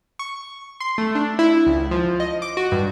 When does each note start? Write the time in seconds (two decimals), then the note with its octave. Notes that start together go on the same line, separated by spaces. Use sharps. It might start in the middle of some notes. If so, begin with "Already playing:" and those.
0.19 C#6
0.80 C6
0.98 A3
1.15 D4
1.39 E4
1.67 C#2
1.91 F3
2.20 D#5
2.42 D6
2.57 F#4
2.72 G2